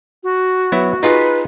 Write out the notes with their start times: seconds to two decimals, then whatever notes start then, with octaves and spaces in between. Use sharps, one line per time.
0.23 F#4
0.72 F#3 B3 E4
1.03 D#4 F4 G#4 B4